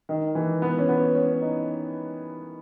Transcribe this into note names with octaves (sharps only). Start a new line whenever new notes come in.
D#3
E3
B3
C#4
B3
C#4
D#4